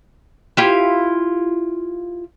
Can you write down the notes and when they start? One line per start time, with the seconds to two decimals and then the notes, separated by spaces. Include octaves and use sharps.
0.57 E4 F4 G4